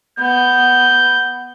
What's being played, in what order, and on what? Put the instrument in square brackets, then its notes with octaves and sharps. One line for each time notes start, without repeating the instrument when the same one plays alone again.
[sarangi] B3 [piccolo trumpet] G6